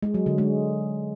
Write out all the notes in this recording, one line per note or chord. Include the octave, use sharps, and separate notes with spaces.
G#3
F#3
D3
G#3